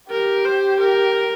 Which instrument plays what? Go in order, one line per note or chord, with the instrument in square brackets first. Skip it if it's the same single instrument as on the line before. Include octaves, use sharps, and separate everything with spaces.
[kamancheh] G4 [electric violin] A#4
[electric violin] C5
A#4